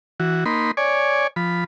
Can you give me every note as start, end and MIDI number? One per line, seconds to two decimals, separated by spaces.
0.20 0.44 52
0.20 0.44 66
0.46 0.71 58
0.46 0.71 63
0.46 0.71 83
0.46 0.71 84
0.77 1.27 73
0.77 1.27 74
0.77 1.27 80
1.36 1.64 53
1.36 1.64 83